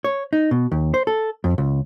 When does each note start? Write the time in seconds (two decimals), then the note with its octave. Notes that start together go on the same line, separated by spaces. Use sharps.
0.04 C#5
0.33 D#4
0.51 B2
0.72 D#2
0.94 C5
1.07 A4
1.44 F2
1.58 C#2